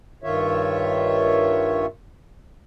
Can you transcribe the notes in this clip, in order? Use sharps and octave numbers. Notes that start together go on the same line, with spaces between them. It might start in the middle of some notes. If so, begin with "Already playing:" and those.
G2 D#3 F4 C#5 E5